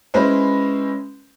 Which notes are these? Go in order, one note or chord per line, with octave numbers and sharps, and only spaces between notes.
G#3 C#4 E4 B4 C5